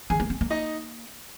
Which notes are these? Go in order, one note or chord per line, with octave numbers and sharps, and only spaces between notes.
D#3 G#4 G#5
A#3
C4
A#3
D#4 D#5